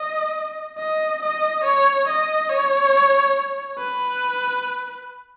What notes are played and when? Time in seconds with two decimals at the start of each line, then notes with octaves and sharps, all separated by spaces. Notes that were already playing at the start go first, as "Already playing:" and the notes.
Already playing: D#5
0.78 D#5
1.22 D#5
1.64 C#5
2.08 D#5
2.50 C#5
3.78 B4